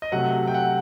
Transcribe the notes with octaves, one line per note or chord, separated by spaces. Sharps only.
D#5
C3 F#3 A3 F#5
G5
F#5